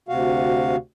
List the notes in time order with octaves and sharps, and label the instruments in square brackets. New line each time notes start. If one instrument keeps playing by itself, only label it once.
[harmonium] D2 C3 F#4 F5